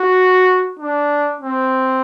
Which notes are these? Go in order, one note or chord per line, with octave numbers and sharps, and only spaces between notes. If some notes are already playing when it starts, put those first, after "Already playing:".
Already playing: F#4
D4
C4